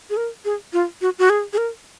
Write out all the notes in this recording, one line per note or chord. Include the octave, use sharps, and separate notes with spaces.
G#4
A#4
G#4
F4
F#4
F#4
G#4
G#4
A#4